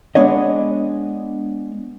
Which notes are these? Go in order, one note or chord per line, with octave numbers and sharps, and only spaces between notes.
G#3 B3 D4 C#5 D#5